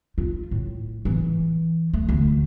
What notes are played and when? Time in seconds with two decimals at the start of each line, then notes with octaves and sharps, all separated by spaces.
0.18 F4
0.51 A2
1.05 E3
1.93 A3
2.09 D2